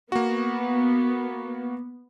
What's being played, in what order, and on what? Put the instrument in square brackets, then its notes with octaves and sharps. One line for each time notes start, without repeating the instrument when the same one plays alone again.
[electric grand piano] A#3 F#4 [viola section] B3